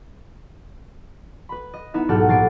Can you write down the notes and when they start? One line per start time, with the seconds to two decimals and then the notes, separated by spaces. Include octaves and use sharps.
1.49 B4 B5
1.74 D#5
1.94 B3 D#4 E4 E5
2.08 B1 G#2 G4 A4 F#5 F6
2.28 A#1 A6 C7 D7